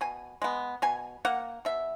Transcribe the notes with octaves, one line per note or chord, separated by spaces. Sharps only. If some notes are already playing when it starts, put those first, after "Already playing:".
B2 G#5
G#3 B3
B2 G#5
A#3 F#5
B2 E5